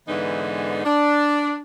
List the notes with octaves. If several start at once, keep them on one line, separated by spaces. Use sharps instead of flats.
G#2 D3 E3 B3 D#4
D4